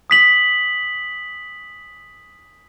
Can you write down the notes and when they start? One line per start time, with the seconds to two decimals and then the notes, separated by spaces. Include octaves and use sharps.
0.10 D#6 B6 F#7